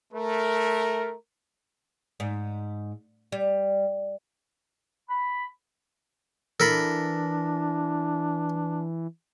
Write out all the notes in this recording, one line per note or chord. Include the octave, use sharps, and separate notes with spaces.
A3 A#4
G#2
G3
B5
E3 D4 A4 A#4 B5